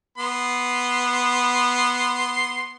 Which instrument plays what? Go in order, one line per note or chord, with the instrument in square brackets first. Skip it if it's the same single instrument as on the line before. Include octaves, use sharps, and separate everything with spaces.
[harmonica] B3 C6